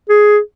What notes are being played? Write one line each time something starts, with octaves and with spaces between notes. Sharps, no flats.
G#4